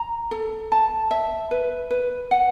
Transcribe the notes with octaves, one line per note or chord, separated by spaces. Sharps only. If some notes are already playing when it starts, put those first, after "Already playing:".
Already playing: A#5
A4
A5
E5
B4
B4
F#5